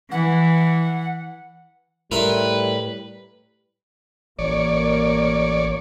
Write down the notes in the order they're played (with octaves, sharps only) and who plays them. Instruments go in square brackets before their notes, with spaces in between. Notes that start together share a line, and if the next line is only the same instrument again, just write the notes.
[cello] E3 [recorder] F#5
[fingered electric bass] A2 [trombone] G3 [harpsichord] A#4 E5 C6 [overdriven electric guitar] B4
[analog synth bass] A1 [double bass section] A#3 [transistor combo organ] C#5 D5